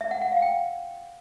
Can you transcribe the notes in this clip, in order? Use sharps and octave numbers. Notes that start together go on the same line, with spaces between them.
E5
F#5
F#5
F5
G5